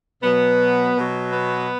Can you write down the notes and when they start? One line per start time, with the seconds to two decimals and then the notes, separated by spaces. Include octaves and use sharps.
0.22 B2 F#3 B3
0.97 B2 F#3
1.33 B3